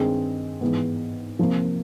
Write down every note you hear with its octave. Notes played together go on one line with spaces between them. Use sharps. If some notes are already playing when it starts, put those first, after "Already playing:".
Already playing: G2 D#3 G#3 C4 G#4
G#2 E3 G#3 B3
C3 F3 A#3